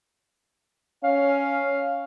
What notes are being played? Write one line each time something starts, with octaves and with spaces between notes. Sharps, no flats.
C#4 F5